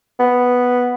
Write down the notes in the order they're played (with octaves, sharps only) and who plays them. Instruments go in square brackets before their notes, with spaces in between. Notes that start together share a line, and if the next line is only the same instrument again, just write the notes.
[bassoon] B3